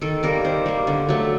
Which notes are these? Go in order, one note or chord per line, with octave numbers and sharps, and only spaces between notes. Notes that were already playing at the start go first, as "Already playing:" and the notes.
D#3 A4
G3 A#3 A#4
D#3 C5
G3 A#3
D3
F#3 A3